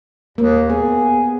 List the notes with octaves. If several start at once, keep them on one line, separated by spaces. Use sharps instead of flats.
D#2 A#3
B3 G#4